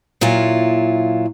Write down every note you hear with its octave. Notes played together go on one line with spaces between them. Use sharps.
A#2 F#3 E4 F4